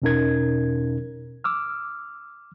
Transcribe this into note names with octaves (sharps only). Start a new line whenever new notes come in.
E2 B2 C#4 D#4 A#4 G#6
D6 E6 F6